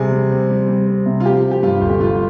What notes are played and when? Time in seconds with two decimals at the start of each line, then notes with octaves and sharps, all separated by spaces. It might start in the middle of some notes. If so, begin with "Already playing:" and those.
Already playing: C3 G3 G#4
0.12 G3
0.31 C4
0.50 G3
0.69 G3
0.87 C4
1.06 C3
1.20 F4
1.24 F3 G4
1.43 F3
1.51 G4
1.63 G2 F4
1.81 G1
1.90 G4
2.00 G2 F4